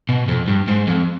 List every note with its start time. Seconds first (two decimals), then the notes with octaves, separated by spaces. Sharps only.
0.09 B2
0.28 F2
0.48 G2
0.68 G#2
0.87 F2